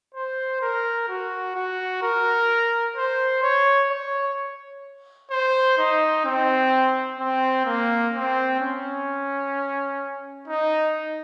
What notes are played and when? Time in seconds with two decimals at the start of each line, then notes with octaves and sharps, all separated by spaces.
0.14 C5
0.61 A#4
1.09 F#4
1.56 F#4
2.02 A#4
2.96 C5
3.43 C#5
3.90 C#5
5.31 C5
5.78 D#4
6.25 C4
7.19 C4
7.65 A#3
8.13 C4
8.60 C#4
10.48 D#4